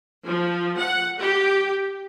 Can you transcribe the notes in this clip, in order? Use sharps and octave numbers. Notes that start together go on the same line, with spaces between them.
F3
F#5
G4